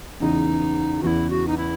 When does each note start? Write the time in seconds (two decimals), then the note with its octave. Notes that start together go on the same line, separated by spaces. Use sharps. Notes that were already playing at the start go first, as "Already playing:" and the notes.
0.20 E2 C#3 E3 D#4
1.03 E2 C#3 E3 E4 F#4
1.30 F#4
1.48 D#4
1.57 E4